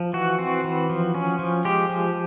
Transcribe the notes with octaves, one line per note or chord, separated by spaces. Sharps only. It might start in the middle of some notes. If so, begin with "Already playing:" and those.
Already playing: F3
E3 F#4
C4
E3
F3
C#4
F3
G#3 G4
F3